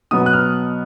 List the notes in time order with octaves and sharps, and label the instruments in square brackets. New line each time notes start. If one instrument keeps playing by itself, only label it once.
[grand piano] B2 F#3 B3 D#6
F#6
F6